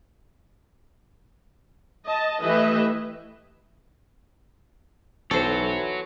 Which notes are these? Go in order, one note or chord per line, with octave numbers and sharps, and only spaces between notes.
D#5 A5
E3 A3 G4 B4 D#5 E5
B1 E3 F#4 A4 C5 C#5